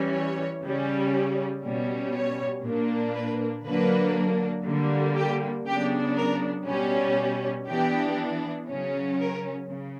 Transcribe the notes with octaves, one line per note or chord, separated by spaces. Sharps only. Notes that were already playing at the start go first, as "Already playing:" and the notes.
Already playing: E3 G3 C#4
C#5
C#3 G3 C#4
B2 G3 C#4
C#5
A#2 A#3 D4
B4
D3 F#3 A#3 D4 B4
D3 G3 A#3
G4
C#3 F#3 B3 D4 G4
A#4
B2 G3 C#4
E3 B3 D4 G4
C#3 F#3 C#4
A#4
C#3